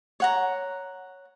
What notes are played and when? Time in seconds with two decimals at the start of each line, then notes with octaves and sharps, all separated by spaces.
0.20 C#5 F#5 A#5